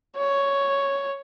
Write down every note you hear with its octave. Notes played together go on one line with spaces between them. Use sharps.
C#5